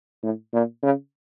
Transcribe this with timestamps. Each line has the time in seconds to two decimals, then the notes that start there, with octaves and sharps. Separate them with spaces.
0.23 A2
0.53 A#2
0.83 C#3